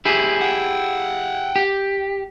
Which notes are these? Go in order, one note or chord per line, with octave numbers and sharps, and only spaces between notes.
E4 G4 G#4
F#5 G5
G4